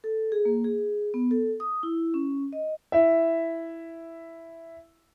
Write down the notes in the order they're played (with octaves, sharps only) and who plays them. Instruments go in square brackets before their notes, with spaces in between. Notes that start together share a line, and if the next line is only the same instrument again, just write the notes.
[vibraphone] A4
G#4
A#3
G#4
B3
A4
D#6
E4
C#4
D#5
[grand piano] E4 E5